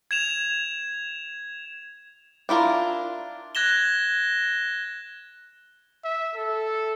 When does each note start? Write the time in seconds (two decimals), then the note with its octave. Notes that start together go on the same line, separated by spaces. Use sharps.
0.11 G#6 E7 F7
2.49 D4 E4 F4 A#4
3.55 F#6 G#6 A#6 E7 G7
6.04 E5
6.35 A4